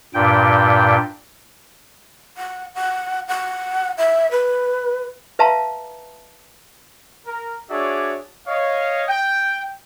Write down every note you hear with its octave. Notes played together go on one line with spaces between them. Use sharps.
G2 A#2 G5
F#5
F#5
F#5
E5
B4
B4 E5 F5 A5 A#5 C6
A#4
D4 F#4 G#4 C#5 D5 E5
C#5 D#5 F5
G5